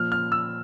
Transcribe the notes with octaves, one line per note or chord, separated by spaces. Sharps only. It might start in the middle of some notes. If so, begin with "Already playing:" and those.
Already playing: A#2 F3 F6
F6
E6